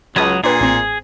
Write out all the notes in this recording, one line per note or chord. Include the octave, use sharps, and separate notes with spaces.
C#2 F#3 C#5 D#5 A5 B5 D#6
A#2 D4 G#4 B4 G5
A1 C4